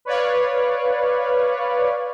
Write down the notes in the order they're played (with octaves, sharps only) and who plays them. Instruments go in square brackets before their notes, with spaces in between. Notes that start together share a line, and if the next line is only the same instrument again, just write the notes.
[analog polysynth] B4 C#5 D5 F5